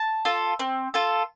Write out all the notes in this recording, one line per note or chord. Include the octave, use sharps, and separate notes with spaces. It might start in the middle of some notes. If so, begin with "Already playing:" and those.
Already playing: A5
F4 A4
C4
F4 A4